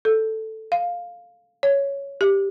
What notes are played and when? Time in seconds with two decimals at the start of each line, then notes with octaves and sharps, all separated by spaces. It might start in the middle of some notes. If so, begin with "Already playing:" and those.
0.05 A4
0.72 F5
1.63 C#5
2.21 G4